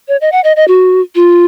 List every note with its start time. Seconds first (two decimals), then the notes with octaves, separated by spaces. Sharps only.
0.08 C#5
0.21 D#5
0.32 F#5
0.44 D#5
0.56 D#5
0.68 F#4
1.15 F4